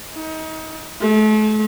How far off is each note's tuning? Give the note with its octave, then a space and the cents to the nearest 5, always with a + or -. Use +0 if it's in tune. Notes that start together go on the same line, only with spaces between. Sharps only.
D#4 +30
A3 -40